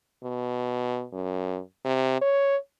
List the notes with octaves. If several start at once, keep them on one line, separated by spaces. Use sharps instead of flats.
B2
F#2
C3
C#5